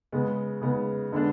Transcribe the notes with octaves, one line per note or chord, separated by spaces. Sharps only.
C#3 G#3 B3
C#3 G#3 B3
D3 G#3 B3 D4